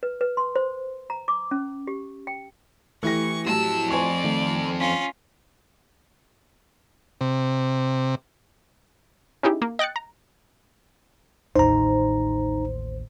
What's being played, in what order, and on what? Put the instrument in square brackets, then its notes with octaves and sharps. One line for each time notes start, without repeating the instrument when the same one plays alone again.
[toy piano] B4
B4
C6
C5
A#5
D6
C#4
G4
G5
[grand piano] E3 A#6 [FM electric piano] A3 E4 G4 [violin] C#6
[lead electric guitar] F2 A5 [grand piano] A2 F#3 [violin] E6
[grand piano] C5 G#5 C#6 [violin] D5
[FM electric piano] D#3 A3
[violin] C#4 F4 [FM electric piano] B6
[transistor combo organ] C3
[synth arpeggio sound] C#4 D#4 E4 G4 G#4
A#3
D#5 G5 F#6 A6 C#7
A#5
[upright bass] A1 D#2 [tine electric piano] D#4 A#5 [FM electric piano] C5